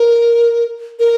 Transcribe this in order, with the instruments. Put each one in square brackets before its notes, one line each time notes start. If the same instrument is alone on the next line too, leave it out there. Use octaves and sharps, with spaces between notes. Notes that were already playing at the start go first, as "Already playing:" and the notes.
Already playing: [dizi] A#4
A#4